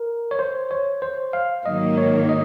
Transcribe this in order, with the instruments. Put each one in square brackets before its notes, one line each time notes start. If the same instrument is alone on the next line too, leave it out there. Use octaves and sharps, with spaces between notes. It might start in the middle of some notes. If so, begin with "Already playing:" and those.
Already playing: [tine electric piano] A#4
C#5
C5
C#5
C5
F5
[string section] G#2 D#3 F#3 A#3 [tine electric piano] D#5
[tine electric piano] C#5
D#5